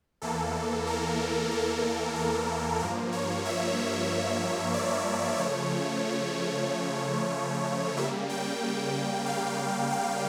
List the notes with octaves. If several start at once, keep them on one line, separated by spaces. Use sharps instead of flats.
E2 E3 A#3 A4
A#4
A#4
A#4
G2 F3 A#3 A#4
C#5
E5
D5
C#3 F3 A3 C#5
C#3 G3 A#3 E5
G5
F5
F5